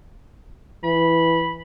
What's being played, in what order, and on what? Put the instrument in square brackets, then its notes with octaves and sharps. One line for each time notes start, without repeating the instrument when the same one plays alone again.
[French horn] E3 [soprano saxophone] B5